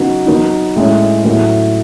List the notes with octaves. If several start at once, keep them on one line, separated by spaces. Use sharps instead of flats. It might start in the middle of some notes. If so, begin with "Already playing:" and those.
Already playing: C#3 F#3 B3 D#4 F#4
F#3 B3 D#4
A2 G#3 C#4
A2 F#3 B3